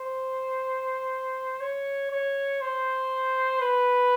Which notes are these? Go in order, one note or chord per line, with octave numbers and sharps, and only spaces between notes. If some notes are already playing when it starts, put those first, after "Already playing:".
Already playing: C5
C#5
C#5
C5
B4